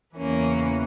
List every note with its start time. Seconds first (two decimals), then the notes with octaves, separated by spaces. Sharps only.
0.17 E2 C#3 E3 A#3 C#4